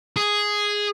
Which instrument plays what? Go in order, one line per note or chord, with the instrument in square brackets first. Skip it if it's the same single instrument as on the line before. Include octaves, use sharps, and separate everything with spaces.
[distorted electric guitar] G#4